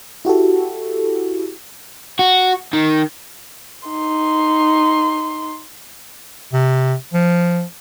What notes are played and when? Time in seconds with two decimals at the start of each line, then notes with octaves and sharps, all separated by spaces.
0.25 E4 F#4 G4 A4
2.19 F#4
2.73 D#3
3.88 D#4 C6
6.53 C3
7.14 F3